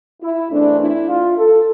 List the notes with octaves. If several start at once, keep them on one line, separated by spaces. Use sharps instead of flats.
E4
E2 E3 A3 C4 D4
E4
F4
A4